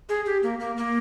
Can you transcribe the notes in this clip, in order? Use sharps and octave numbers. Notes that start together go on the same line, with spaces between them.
G#4
G4
A#3
A#3
A#3